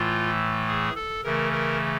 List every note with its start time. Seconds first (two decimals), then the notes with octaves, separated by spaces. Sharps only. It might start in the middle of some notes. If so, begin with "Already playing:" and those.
Already playing: A2 E3 A3 F4
0.68 G#4
0.96 A4
1.24 C#3 E3 A3 A#4
1.52 A#4